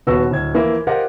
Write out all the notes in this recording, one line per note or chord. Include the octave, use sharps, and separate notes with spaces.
D#1 B3 F#4 E6
D1 G#6
E3 F3 A#3 E4
F4 G4 A#4 C5 D#5 F#5